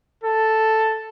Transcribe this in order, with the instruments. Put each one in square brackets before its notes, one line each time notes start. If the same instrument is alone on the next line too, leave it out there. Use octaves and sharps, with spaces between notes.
[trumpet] A4